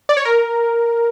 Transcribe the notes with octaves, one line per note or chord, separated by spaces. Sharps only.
D5
C#5
A#4